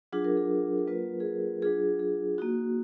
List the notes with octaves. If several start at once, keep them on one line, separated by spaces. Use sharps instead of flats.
F#3 D4 F4 G#4
A#4
G#4
A#4
F#3 A#3 F4 B4
G#4
A#4
F#3 D4 F4 G#4
G#4
A#3 D#4 F#4